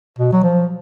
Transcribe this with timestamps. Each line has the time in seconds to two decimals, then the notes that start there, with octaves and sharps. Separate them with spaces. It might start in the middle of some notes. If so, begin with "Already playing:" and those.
0.19 B2
0.33 F#3
0.44 F3